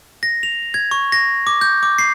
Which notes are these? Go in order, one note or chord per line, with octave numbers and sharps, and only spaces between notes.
A#6
F7
G#6
C#6
A#6
D6
G6
D6
C7